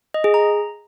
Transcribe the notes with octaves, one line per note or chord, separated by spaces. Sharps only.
D#5
G#4
A#5